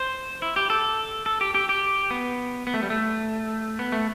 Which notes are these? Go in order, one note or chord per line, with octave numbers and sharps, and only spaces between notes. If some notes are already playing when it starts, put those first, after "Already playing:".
Already playing: C5
E4
G4
A4
A4
G4
G4
G4
B3
B3
A3
G3
A3
B3
A3